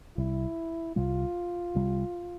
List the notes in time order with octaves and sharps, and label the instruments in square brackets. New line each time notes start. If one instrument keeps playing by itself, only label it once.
[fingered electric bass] C2 C3 G3 [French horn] E4
[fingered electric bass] C2 C3 G3 [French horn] F4
[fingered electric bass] C2 C3 G3